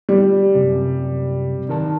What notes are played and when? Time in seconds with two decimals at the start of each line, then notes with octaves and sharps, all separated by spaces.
0.09 G3
0.55 F#2 C3
1.69 D#3 A#4 A5